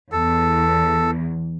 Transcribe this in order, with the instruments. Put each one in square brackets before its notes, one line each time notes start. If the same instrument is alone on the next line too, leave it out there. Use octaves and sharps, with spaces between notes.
[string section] E2 [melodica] A4